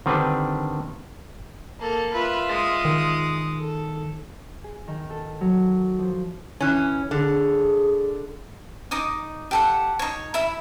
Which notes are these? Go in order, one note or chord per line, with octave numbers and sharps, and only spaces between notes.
D3 D#3 G3 C4 D4 B4
A#3 A4
F4 B4 E5
G#3 D#6
D#3
A4
G#4
D#3
A4
F#3
F3
E3 C#4
D3 G#4
D#4 D#5 D6 D#6
G4 A4 F#5
D#4 C#5
E4 E5 B5